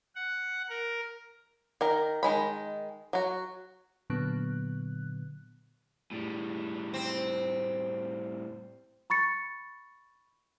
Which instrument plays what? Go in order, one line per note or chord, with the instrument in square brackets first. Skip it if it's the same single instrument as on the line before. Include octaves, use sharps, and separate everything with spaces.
[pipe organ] F#5
A#4
[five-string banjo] D#3 A#4
D#3 G#3 B5
F#3 F#4
[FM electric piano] A#2 D3 F#3 B3 F#6
[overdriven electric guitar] A2 G3
[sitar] C4
[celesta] B5 C#6 A6 C#7